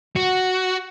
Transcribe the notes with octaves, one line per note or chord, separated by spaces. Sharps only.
F#4